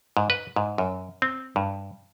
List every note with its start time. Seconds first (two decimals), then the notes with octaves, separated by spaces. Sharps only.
0.17 G#2
0.30 B4
0.56 G#2
0.78 F#2
1.22 C4
1.56 G2